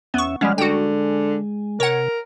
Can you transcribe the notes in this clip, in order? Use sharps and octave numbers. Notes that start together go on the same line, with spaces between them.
E2 B3 C#4 E5 C#6
F3 G3 G#3 C#4 F#5 F6
D3 G#3 F#4 G5
C3 A#4 C#5 F#5